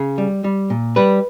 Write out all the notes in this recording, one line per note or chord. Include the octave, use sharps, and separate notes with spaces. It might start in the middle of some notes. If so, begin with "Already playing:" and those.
Already playing: C#3
G3
G3
A#2
G3 B4